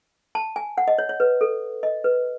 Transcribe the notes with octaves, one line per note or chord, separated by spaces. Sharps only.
A5
G#5
F#5
D#5
C#5
C#5
B4
A4
D#5
B4